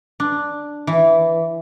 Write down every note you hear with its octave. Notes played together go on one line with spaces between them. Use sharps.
D4
E3